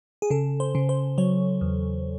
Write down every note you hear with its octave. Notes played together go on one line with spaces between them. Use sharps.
G#4
C#3 A4
C5
C#3
C5
F#3 C#5
E2